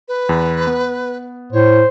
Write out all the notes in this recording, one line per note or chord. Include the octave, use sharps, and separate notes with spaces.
B4
E2
B3
A2 C5 C#5